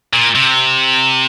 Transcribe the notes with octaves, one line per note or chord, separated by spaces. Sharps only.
A#2
C3